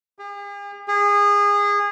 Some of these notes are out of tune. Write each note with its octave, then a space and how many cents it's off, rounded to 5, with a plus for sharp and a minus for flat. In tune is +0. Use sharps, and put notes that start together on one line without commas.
G#4 -45
G#4 -25